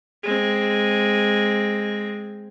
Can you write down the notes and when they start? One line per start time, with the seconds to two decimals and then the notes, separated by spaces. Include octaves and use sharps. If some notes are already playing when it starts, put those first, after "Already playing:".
0.23 G#3 C4